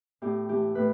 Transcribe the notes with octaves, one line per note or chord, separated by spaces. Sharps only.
A2 G4
E3 A3 G4
A2 B4